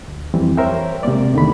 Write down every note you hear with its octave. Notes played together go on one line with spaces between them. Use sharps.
D2
F2 E3 G3 C4
A#4 C5 C#5 E5 G5
C3 G#3 A#3 D5
E2 D3 D#3 A3 B5